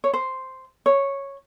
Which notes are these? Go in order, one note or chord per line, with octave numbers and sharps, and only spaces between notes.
C#5
C5
C#5